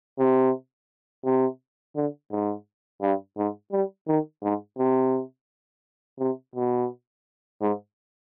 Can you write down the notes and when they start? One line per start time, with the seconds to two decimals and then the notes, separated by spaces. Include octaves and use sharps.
0.19 C3
1.25 C3
1.96 D3
2.31 G#2
3.02 G2
3.37 G#2
3.72 G3
4.08 D#3
4.43 G#2
4.78 C3
6.19 C3
6.55 B2
7.61 G#2